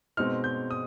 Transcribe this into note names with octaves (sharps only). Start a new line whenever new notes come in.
B2 G#3 C4 D#4 F6
G6
D#6